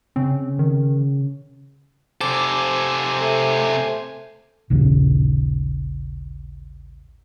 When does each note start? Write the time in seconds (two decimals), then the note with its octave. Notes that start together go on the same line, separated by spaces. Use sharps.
0.16 C#3 C4
0.59 D#3
2.21 C3 A4 C5 G#5 D6
3.21 A3
4.70 A1 D#2 A#2 C#3